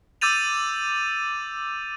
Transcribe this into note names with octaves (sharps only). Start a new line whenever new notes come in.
D6 E6 G6 A6 D#7 F7